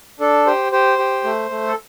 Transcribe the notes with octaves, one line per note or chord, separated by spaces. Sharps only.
D4 A4
G4 C5
G4 C5
G4
A3
A3
A4